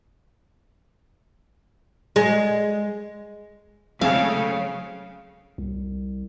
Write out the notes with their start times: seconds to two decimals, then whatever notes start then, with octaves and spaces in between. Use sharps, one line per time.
2.16 G#3
4.01 C#3 F#3 G#3 A3 C4 F5
5.58 C2